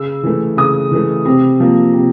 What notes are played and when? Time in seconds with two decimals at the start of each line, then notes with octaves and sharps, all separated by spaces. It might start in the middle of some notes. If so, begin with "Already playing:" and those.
Already playing: C#3 E6
0.23 E3 A3
0.57 C#3 D#6
0.91 E3 A3
1.25 C3
1.60 F3 A#3
1.94 C3